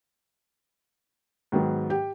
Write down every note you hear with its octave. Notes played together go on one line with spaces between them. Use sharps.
G#2 D#3 F#3 B3
G4 G5